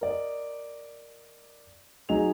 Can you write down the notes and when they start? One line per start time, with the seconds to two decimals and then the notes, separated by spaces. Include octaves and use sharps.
0.01 A#4 D5 D#5
2.09 F#3 D#4 G#4 D#5 G#5 F7